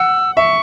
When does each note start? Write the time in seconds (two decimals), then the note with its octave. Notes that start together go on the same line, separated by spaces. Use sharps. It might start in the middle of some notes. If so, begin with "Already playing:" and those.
Already playing: F#5 E6
0.36 E5 C#6